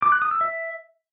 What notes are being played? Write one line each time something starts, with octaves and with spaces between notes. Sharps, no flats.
D6
F#6
D#6
E6
E5